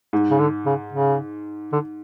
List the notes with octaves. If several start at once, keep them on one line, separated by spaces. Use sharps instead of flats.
G#2
C#3
D3
C#3
C#3
D3